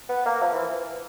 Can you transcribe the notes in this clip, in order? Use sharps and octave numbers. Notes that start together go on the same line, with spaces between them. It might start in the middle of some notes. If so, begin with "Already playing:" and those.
B3
A#3
F3
E3